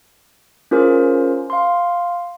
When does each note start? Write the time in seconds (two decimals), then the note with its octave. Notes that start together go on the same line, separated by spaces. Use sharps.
0.71 C#4 F4 G#4 A#4 C5
1.50 F5 C6